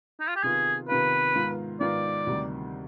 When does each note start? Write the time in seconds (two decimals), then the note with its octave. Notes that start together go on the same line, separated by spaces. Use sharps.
0.20 D#4
0.28 F4
0.36 G4
0.43 C3 D#3 B3 F4 G#4
0.88 C3 D#3 B3 F4 B4
1.35 G#2 D#3 B3 F4
1.80 G#2 D#3 B3 F4 D5
2.27 D2 C3 D#3 G3